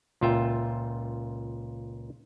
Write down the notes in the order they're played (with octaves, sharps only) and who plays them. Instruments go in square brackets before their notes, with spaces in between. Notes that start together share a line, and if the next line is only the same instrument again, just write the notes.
[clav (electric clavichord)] C#2 A#2 F4 E5 G5